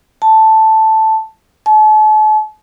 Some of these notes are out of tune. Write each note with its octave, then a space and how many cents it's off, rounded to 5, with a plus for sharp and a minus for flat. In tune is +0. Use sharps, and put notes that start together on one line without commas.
A5 +0
A5 -40